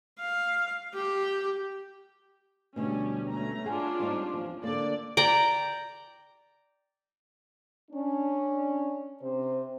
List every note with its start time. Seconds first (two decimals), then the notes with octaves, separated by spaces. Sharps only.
0.19 F5
0.94 G4
2.76 D2 B2 G3 C#4
3.30 A3 C#4 A#5
3.66 C#4 D4 F4 G#4 F#5
4.00 G3 C4 D#4
4.34 E2 F3
4.63 D3 A#3 D5
5.17 D5 G5 A#5
7.91 C#4 D4
9.22 C3 C4 C5